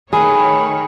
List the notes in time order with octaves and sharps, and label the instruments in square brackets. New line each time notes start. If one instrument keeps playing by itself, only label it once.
[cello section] D#3 A3 C#5 [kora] G#4 B4 [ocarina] B5